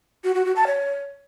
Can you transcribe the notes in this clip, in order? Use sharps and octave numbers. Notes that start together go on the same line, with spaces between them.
F#4
F#4
F#4
A5
C#5